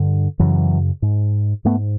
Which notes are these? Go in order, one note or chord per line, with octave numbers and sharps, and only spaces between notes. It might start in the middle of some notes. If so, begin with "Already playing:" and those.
Already playing: G2 D3
F#2 C#3 E3 F#3
G#2
G#2 A3 B3